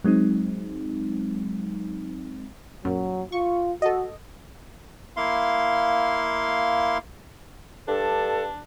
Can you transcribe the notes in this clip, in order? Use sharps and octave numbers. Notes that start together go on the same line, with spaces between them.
F#3 G#3 C4 D#4
F#2 A#2 F#3
F4 C#6
F#4 A4 D#5
A#3 E4 F5 C6
G2 D4 A4